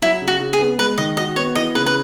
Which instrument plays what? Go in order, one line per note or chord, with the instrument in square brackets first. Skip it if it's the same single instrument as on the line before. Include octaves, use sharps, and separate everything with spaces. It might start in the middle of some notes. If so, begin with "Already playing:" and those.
[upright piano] F#3 [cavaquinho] E4
[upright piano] C#3
[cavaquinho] F#4
[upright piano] C#3
[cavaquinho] G#4
[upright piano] B3
[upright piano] G#3 [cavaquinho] B4
[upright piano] D#3 [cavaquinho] D#5
[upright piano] F#4 [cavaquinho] D#5
[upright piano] B3 [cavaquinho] C#5
[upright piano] E3 [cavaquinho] D#5
[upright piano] C#3 [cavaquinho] B4
[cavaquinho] B4